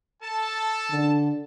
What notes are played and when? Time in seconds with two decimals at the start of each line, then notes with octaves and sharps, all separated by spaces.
0.23 A4 A5
0.90 D3